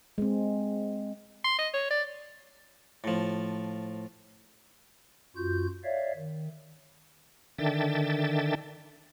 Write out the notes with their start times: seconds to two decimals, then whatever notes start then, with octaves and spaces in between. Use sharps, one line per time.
0.18 G#3 C4
1.45 C6
1.59 D#5
1.74 C#5
1.90 D5
3.04 A2 F3
5.36 F#2 F4 F#4 G6
5.84 C#5 D5 E5 F5
6.16 D#3
7.58 D3 D#3 D4 E5 G5 A6